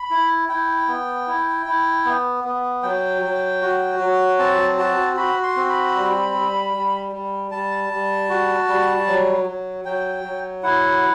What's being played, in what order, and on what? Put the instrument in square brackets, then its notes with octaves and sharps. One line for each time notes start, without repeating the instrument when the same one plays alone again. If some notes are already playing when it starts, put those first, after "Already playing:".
Already playing: [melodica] B5
E4
E4 G5
B3
E4
E4
B3
B3
F#3 G5
F#3
F#4
F#3
C4 A5
F#4 A5
F#4 B5
C6
C4
B5
G3
G3
G3
G3
G3 A5
G3
F#4
G3
F#3
F#3
F#3 G5
F#3
E4 F#5